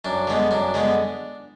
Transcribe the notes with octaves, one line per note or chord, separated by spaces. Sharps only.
F#2 D4
D3 G#3 B3
F#2 D4
D3 G#3 B3